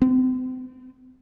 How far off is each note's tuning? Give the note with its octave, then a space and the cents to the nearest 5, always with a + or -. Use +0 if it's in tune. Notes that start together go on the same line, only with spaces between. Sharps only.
C4 -40